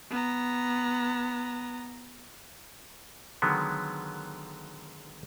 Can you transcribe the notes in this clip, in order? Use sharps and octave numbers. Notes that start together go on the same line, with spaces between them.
B3 A#5
D3 D#3 F#3 G#3 B3